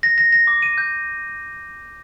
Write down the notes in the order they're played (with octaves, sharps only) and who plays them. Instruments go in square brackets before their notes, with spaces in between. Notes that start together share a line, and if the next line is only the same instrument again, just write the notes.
[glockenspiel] A#6
A#6
A#6
D6
D#7
G6